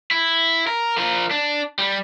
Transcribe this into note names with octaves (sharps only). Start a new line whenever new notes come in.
E4
A#4
F3 A#4
D4
G3